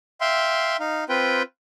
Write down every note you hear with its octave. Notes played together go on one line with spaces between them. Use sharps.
E5 F5 G5 C6
D#4 F5
C4 F4 B4 G5